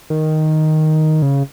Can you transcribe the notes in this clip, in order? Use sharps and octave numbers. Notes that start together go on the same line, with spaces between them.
D#3
C#3